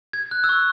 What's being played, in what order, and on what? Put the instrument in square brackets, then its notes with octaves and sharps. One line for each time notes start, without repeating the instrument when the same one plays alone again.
[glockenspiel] G#6
F#6
E6
C#6